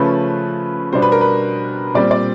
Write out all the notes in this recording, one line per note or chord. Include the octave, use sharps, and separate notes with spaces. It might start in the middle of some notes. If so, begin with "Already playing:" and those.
Already playing: C#3 F3 A3 C#4 B4
B2 G3 B3 D4 C5
B4
A#4
B4
A#2 G3 C4 D5
D5